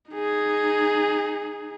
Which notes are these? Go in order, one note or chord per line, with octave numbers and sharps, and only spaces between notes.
D#4 G#4